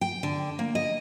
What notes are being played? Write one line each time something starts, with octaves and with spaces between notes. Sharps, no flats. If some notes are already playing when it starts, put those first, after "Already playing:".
G5
D3
A#3
D#5